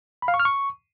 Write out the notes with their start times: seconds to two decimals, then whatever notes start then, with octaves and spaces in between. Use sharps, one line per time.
0.22 B5
0.28 F5
0.34 C#6
0.40 F6
0.45 C#6